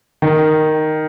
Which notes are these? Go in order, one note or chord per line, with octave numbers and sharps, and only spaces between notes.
D#3